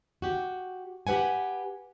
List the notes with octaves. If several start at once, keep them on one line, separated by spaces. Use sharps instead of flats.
F#4 G4
G4 A4 B4 F#5 G#5